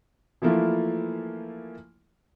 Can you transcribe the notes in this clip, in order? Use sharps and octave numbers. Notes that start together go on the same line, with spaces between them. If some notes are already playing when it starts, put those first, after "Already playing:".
E3 F3 A3 A#3 E4 F4